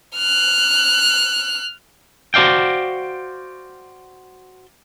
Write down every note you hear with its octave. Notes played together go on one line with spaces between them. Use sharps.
F6 F#6
F#4 C5 D5 F5 G5